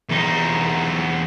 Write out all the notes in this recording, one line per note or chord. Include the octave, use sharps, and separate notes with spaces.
E2 D#4